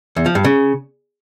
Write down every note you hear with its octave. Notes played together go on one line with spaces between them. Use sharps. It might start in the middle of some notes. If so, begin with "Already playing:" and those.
E2
F3
G2
C#3